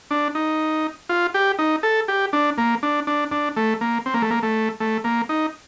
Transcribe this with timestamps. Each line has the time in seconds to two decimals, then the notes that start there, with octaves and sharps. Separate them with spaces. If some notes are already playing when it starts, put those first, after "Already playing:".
0.11 D4
0.35 D#4
1.09 F4
1.34 G4
1.59 D#4
1.83 A4
2.08 G4
2.33 D4
2.58 A#3
2.83 D4
3.07 D4
3.31 D4
3.56 A3
3.81 A#3
4.06 C4
4.14 A#3
4.22 A3
4.30 A#3
4.43 A3
4.80 A3
5.04 A#3
5.29 D#4